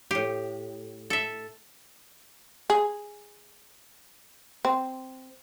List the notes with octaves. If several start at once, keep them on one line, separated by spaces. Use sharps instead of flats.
A2 G4
A4 E5
G#4
C4